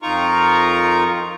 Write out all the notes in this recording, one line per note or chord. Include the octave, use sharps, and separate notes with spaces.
F2 D#4 F4 A#4 A#5 C#6